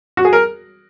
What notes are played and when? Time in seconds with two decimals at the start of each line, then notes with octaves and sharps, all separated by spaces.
0.17 F#4
0.25 G#4
0.33 A#4